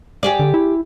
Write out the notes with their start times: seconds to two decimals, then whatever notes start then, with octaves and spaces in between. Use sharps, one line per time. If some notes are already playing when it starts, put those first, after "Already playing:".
0.23 G4 G#4 D5
0.40 D3
0.54 E4